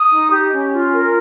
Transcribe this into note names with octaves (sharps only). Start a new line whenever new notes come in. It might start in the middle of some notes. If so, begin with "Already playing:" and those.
Already playing: D#6
D#4
G4
C#4
F4
A#4